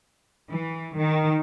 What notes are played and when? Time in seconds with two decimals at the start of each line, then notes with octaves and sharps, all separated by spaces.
0.50 E3
0.97 D#3